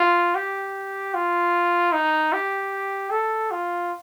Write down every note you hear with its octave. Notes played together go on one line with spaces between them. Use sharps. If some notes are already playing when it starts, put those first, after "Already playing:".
Already playing: F4
G4
F4
D#4
G4
A4
F4